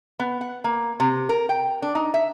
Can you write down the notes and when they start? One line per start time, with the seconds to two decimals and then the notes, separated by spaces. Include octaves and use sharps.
0.19 B3
0.41 F#5
0.64 A#3
1.00 C3
1.29 A#4
1.49 G5
1.82 D4
1.95 D#4
2.14 E5